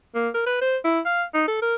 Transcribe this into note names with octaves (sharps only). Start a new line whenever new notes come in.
A#3
A#4
B4
C5
E4
F5
D#4
A4
A#4